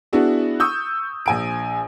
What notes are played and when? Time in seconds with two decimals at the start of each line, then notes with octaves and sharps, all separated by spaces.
0.13 B3 D4 E4 F#4 G#4
0.60 C#6 D#6 E6 G6
1.26 A#1 G#5 D7